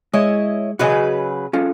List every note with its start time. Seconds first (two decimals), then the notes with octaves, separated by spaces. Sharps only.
0.14 G#3 E4 C#5 D#5
0.79 C#3 F#3 F#4 B4 D#5 G#5
1.53 C#4 F4 A4